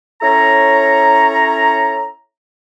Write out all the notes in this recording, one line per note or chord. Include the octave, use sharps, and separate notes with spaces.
C#4 E4 A4 C#5 A#5